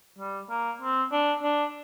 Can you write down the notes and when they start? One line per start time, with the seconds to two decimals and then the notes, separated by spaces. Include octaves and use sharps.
0.19 G3
0.50 A#3
0.81 C4
1.12 D4
1.43 D4